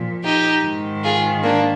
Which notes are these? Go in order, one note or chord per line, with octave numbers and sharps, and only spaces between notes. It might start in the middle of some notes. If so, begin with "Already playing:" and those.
Already playing: A#2 F3
D#4 G4
G#2 D#3
F4 G#4
A#3 D4